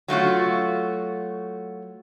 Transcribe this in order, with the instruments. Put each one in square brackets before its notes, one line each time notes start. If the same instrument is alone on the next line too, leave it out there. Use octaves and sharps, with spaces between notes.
[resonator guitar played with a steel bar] F#3 A3 F4 F#4